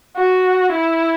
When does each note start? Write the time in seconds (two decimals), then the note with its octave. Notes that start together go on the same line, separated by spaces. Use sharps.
0.17 F#4
0.72 E4